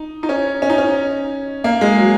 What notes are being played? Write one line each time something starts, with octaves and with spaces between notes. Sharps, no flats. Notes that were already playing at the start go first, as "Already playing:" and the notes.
Already playing: D#4
D#4
C#4
C#4
D#4
C#4
A#3
G#3
F#3